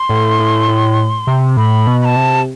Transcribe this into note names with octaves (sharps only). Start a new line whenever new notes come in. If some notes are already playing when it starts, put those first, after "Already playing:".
Already playing: C6
A2
A2
A2
C3
A2 B5
B2
B5
A5
C3